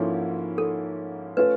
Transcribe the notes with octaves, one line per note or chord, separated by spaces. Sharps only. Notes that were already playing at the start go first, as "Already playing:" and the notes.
Already playing: G#2 F3 A#3 C#4 E4 A4
A4
A3 C#4 F4 B4